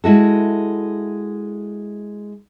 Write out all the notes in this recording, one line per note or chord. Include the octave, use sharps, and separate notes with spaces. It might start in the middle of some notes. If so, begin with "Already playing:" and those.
G#3 E4 F#4 A4